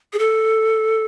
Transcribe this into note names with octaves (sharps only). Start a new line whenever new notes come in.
G#4
A4